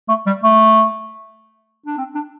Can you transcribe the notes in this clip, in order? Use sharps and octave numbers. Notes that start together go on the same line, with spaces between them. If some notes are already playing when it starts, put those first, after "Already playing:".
A3
G3
A3
D4
C4
D4